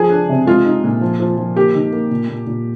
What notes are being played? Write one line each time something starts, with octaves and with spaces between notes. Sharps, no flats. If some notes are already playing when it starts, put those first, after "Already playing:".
Already playing: F3 G#4
D4
C3
G#3 F4
D#4
A#2
F3
F3
F3
A#3 G4
D#3
A#3
A#2
A#2
A#2